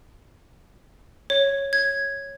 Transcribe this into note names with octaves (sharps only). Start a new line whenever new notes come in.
C#5
G#6